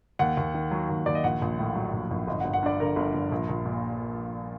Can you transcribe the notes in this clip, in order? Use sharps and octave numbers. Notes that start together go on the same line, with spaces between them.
D#2 F#5
D#2
D#3
F#3
D#2
D#2 D5
D#5
A#1 F#5
A#1
A2
F#3
A#1
A#1
G1 D#5
F#5
G1
F#5
G2 D5
D3 A#4
G1
G1
A#1
A#1
A#2